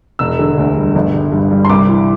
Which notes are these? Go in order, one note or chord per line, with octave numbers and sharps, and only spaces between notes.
E1 E6
D3
D2
G3
G1
D3
G2
G3
C6
C2 D6
E3